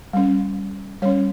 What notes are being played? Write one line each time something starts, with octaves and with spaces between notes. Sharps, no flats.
G3 C#4
G3 C#4 C#5